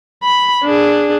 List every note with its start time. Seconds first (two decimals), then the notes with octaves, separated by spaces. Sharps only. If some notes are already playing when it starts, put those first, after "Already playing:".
0.23 B5
0.64 D4 G#4